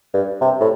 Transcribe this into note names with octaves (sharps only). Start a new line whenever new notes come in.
G2
C3
A2